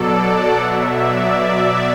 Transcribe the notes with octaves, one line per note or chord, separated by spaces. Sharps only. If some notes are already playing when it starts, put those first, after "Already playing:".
Already playing: B2 F#3 A4 D5
F#5
B2 F#3 E5
D5
E5